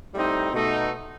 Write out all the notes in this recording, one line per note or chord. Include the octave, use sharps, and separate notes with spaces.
A2 G3 C4 D#4
B2 A3 D#4